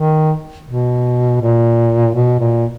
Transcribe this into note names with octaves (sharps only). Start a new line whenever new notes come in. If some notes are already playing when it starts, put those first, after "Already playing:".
Already playing: D#3
B2
A#2
B2
A#2